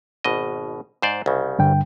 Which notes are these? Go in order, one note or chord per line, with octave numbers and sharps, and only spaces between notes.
G#1 B2 D#5
G#2 C5 D5
C2 C#3
G2 D3 G5